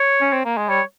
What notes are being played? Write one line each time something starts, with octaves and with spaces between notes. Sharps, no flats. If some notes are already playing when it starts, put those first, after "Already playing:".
Already playing: C#5
C#4
C4
A#3
G#3
G3 C#5